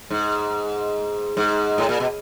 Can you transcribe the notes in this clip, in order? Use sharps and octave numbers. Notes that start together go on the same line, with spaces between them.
G#2
G#2
A2
A#2
B2